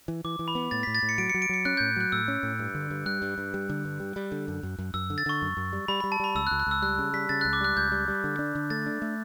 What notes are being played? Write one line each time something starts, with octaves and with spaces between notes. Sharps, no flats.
E3
E3 D6
E3
B5
B3
A2 A6
B6
A2
A6
A2
C#7
F#3 D7
C#7
F#3
D7
F#3 C#7
C#4 F#6
G6
A2
F#3 F#6
A2 E6
C#4
A2
G2
D3
G2
G3 F#6
G2
G2
G3
D3
G2
G3
G3
D3
F#2
F#2
F#2
F#2 E6
D3
A6
D3 C#6
F#2
F#2
G3
G3 B5
B5
G3
A5
G3 B5
C#2 E6
F#6
C#2
F#6
C#2 E6
G3 F#6
C#3
G3 B6
C#3 A6
F#6
C#2
D6
G3 F#6
C#2 G6
G3
G3
D3
D4
D3
A3 A6
D4
A3